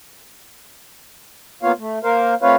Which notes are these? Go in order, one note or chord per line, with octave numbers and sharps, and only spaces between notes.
A#3 B3 F4 C#5 F5
A3
A#3 A#4 C5 F5
A3 C4 F4 B4 C#5 F5